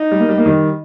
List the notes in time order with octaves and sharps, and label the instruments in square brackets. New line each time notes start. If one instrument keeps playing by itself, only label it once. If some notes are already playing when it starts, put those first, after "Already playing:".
Already playing: [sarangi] D#4
[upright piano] G3
A#3
G3
A#3
D#3 G3